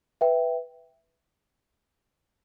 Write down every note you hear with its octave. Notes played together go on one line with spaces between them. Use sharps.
B4 E5 G5